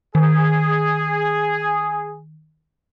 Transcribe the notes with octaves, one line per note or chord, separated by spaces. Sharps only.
D#3 G#4